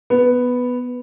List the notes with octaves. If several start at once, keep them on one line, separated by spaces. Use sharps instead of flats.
B3